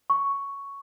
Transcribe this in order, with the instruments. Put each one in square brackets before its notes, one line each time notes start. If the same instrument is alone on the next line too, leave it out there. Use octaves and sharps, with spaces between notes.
[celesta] C#6